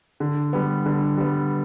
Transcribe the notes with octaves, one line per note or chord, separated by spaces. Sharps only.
D3
G3 B3
D3
G3 B3